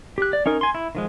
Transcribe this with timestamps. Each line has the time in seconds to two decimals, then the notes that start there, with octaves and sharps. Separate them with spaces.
0.18 G4 F#6
0.33 D5
0.46 C#4 D#4 A#4
0.61 G#5 C6
0.75 E4
0.95 D#3 F3 G#3